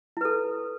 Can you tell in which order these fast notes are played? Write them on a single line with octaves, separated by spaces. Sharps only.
E4 B4 A4